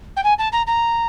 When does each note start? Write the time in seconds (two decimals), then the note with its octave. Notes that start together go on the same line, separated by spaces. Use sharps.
0.16 G5
0.23 G#5
0.38 A5
0.52 A#5
0.67 A#5